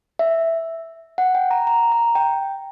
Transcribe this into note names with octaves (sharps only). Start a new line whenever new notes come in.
E5
F#5
G5
A#5
A#5
A#5
G5